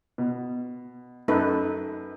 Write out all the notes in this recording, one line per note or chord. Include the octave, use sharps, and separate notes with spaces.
B2
F#2 D#4 A4 B4